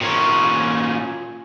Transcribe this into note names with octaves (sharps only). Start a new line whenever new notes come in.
A#2 C#4